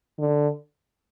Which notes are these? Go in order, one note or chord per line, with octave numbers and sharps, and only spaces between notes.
D3